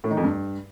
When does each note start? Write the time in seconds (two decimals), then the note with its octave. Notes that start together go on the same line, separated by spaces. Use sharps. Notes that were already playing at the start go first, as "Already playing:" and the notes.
0.04 A2
0.10 D#3
0.17 F2
0.24 G2